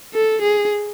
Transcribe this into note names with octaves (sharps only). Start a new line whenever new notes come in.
A4
G#4